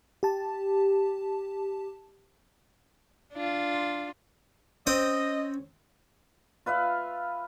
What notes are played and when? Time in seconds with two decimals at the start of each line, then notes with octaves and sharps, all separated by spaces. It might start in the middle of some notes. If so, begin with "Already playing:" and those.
0.23 G4 A5
3.33 D4 F4
4.87 C4 C#4 D#5 G5 D#6
6.66 F4 B4 E5 F5